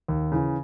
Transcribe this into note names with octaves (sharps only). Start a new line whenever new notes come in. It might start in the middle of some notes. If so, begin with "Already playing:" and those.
D#2
C#3 E3